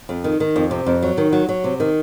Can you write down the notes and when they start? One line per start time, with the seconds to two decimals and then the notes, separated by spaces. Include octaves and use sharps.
0.09 F2
0.24 D#3
0.40 D#3
0.56 F2
0.71 C3
0.86 F2
1.02 F#3
1.18 D#3
1.32 F#3
1.49 F#3
1.64 C3
1.80 D#3